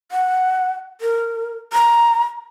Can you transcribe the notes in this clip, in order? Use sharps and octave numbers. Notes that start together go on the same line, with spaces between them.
F#5
A#4
A#5